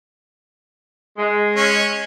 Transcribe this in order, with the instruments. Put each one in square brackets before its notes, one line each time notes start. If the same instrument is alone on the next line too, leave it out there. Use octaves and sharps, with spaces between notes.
[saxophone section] G#3
[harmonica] C#4